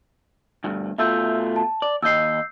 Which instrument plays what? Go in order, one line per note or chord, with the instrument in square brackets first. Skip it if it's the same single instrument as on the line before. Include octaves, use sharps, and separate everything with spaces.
[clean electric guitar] D2 G2
[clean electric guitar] B2 A3 F4 [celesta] E5 E6 G6
[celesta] A5
[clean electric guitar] D5
[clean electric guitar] D#2 D#5 [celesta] E6 G6 C7